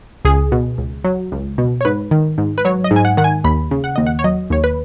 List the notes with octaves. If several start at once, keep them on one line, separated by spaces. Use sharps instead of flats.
C#2 G#4
B2
C#2
F#3
C#2
B2
C#5
G#2 B4
D#3
G#2
B4
F#3 C#5
D#5
G#2
G#5
F#5
D#3 F#5
G#5
D#2 B5
C#3
F#5
D#2 D#5
F#5
C#5
F#3 D#5
D#2 C#5
B4